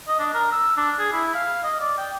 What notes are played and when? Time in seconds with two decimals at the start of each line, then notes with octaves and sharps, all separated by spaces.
0.08 D#5
0.20 D4
0.34 A#4
0.52 E6
0.77 D4
0.99 G#4
1.13 E4
1.35 F5
1.64 D#5
1.81 D5
1.98 G5